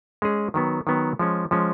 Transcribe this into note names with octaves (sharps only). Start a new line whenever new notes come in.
G#3 C#4 G#4
D#3 F#3 B3
D#3 F#3 B3
F3 G#3 C#4
F3 G#3 C#4